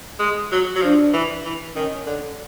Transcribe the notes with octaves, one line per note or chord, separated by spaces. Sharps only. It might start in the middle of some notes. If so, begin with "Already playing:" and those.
G#3
F#3
F#3
F3 D4
E3
E3
D#3 C#4
D3